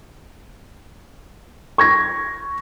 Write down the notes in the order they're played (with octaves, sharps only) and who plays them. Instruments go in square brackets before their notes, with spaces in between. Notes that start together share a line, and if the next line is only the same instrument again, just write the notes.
[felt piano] C#6 G#6 A#6